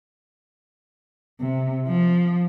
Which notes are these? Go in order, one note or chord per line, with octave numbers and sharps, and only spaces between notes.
C3
F3